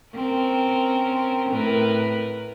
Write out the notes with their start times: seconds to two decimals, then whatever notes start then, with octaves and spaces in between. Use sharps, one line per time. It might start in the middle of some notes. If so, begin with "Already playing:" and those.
0.14 C4 C#4 A#4
1.50 A2 A#4 B4